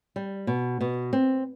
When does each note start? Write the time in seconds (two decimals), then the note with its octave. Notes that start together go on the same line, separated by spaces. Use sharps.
0.16 G3
0.47 B2
0.81 B2
1.13 C4